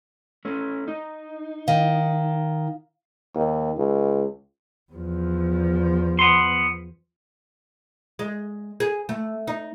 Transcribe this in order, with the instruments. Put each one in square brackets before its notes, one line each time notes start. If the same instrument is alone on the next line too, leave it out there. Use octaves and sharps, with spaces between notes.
[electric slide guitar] A3 C#4
D#4
[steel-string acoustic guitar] D#3 [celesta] F5
[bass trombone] D#2
C#2
[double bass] E2 F3
[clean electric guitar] B3 C6
[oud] G#3
G#4
A3
D#4